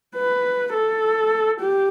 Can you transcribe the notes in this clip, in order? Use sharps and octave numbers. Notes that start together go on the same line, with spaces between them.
B4
A4
G4